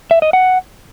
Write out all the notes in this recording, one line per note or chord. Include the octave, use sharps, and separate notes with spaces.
E5
D#5
F#5